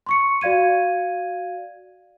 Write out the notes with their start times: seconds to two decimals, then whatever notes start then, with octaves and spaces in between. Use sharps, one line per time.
0.07 C6 C#6 C#7
0.41 F#4 D5 F5 G#6 D#7